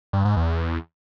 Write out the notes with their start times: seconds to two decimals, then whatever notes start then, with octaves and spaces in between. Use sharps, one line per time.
0.13 G2
0.25 G#2
0.37 E2